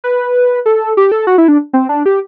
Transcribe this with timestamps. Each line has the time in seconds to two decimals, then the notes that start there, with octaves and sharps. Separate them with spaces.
0.04 B4
0.66 A4
0.97 G4
1.12 A4
1.27 F#4
1.38 E4
1.48 D4
1.73 C4
1.89 D4
2.06 G4